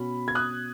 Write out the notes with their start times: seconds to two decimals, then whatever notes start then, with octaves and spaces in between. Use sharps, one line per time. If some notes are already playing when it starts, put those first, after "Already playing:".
Already playing: B2 C#4 B5
0.28 G#6
0.35 D#6 F#6